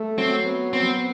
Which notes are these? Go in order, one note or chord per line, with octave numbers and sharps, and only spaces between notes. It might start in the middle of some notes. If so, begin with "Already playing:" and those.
Already playing: A3
F#3 C4
B3
B3 C4